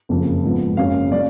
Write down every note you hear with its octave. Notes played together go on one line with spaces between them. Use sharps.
F#1 F2 C#3
G#2 F3 B3
F#1 F#2 C#3 F#3 C#4 F5
G#3 C#4 D5